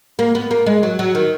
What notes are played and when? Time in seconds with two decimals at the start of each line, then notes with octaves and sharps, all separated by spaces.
0.19 A#3
0.35 B3
0.51 A#3
0.66 G#3
0.83 F#3
0.99 F#3
1.15 D#3